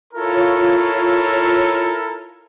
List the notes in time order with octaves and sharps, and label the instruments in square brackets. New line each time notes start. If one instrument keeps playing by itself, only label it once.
[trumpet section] E4 A4 A#4 [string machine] F4 C#5